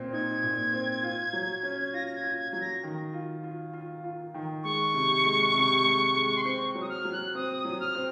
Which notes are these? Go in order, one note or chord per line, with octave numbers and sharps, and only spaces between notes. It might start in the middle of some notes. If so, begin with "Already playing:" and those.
Already playing: A#2 C4
D#4 G#6
A#2
C4
F4
F#3
C#4
F4 A#6
A#6
G#6
F4
G#6
F#3 G#6
A#6
D#3
F4
F4
F4
F4
D#3
G#3 C#6
C3
G#3
C3
G#3
G#3
C6
C4 C#6
F#3
D#6
F6
F#3
F#6
C4 D#6
D#6
F#3
F6
C4